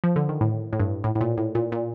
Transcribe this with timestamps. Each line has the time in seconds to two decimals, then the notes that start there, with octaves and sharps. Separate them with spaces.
0.04 F3
0.16 D3
0.29 D#3
0.41 A2
0.73 A2
0.80 G2
1.04 A2
1.15 A2
1.21 A#2
1.38 A2
1.55 A#2
1.72 A#2